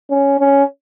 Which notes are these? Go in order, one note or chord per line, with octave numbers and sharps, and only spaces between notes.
C#4
C#4